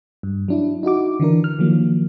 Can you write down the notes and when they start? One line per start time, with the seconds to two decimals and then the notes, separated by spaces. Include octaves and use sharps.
0.23 G2
0.48 F#3 D4 E4
0.83 D#4 E4 F#4 D6
1.20 D3 E3 D4 A#4
1.44 F6
1.59 D#3 F3 F#3 A#3